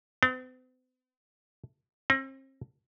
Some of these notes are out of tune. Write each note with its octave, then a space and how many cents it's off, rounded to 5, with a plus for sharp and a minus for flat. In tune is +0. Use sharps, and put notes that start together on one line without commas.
C4 -45
C4 +40